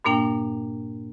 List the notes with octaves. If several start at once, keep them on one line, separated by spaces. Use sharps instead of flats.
G2 A#2 A#3 D4 G5